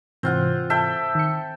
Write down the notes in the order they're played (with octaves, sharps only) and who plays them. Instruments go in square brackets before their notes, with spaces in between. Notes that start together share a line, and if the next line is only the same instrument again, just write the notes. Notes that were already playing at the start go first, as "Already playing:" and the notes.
[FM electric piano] G#2 C3 E3 [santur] C4 F4 F#5
[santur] A4 E5 G5
[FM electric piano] D#3 C#7